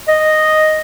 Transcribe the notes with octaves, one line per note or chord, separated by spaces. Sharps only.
D#5